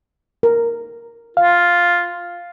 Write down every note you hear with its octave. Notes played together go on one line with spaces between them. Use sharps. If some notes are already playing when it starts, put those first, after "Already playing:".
A#4
F4 F5